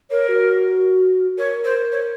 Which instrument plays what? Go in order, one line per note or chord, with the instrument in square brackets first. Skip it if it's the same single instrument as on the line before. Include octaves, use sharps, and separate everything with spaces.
[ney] A#4 [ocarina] C#5
[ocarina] F#4
[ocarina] A#4 [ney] C#5
[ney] C5
C#5